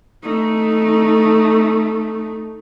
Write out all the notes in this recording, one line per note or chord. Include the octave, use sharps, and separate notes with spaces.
A3 D#4